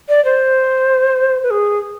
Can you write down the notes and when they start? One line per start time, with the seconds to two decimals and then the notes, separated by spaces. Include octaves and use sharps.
0.09 D5
0.25 C5
1.43 B4
1.50 G#4